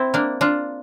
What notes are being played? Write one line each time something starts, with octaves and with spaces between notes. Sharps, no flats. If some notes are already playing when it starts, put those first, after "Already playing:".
Already playing: C4 E4
A#3 D4
D4 F4